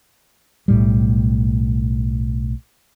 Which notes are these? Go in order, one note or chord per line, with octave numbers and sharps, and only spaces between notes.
B1 A2 G3